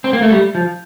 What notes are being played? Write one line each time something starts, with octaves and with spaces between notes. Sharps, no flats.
C4
A#3
A3
G3
F3